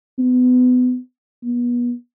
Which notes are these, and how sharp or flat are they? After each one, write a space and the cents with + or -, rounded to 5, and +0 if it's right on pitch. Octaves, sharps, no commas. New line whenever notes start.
B3 +25
B3 -35